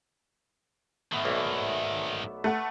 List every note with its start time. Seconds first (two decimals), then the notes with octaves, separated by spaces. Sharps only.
1.12 G#2 D#3 A3 B3
1.25 B1 A#3 D5 E5
2.44 A3 F#5